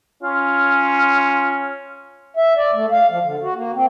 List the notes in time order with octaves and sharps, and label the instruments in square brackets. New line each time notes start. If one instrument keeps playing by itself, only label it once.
[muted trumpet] C#4 [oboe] F4
[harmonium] E5
D5
A3
F5
F3
D3
F#4
A#3
C4